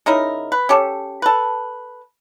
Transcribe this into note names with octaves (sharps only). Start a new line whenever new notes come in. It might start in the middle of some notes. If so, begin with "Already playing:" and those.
C#3 D#4 E4 A#4
B4
C#4 G4 A4
A4 B4